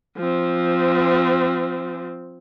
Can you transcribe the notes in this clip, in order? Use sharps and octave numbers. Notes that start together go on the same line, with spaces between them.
F3 C4